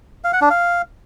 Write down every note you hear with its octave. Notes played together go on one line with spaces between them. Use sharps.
F5
F#5
D4
F5